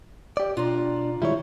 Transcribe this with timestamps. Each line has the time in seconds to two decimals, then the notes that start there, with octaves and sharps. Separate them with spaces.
0.37 G4 D5
0.57 B2 D4 F4 A#5
1.22 D#3 G3 G#3 E4 C#5